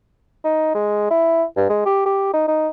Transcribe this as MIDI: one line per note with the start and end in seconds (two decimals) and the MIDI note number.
0.45 0.73 63
0.75 1.06 56
1.10 1.44 64
1.57 1.66 43
1.70 1.86 56
1.86 2.02 67
2.05 2.31 67
2.33 2.44 63
2.48 2.69 63